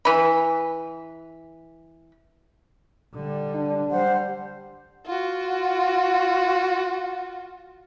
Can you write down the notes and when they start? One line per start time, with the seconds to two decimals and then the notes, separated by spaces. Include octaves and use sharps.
0.05 E3 B5
3.14 D3 G3
3.55 D4
3.91 G3 C5 F#5
5.06 F4 F#4